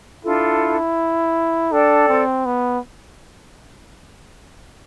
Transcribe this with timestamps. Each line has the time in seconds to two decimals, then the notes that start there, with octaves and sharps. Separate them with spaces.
0.24 D4 E4 F4 A4
1.71 D4 A4 D5 G5
2.09 C4
2.46 B3